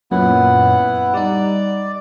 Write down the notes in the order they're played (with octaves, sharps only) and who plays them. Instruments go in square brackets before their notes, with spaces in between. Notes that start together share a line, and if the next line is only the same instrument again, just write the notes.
[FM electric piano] F#2 A#2 C#4 [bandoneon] B3 E4 F#5
[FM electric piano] G3 D#4 [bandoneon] D5